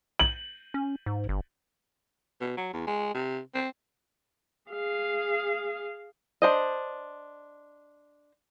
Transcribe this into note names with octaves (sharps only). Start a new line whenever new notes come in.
F#7
C#4
G#2
G1
B2
F#3
E2
G#3
C3
C4
G#4 F5
D4 C5 D#5